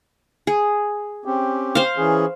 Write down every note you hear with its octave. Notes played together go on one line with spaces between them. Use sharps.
G#4
C4 C#4 G4
C5 F5
E3 C#4 G#4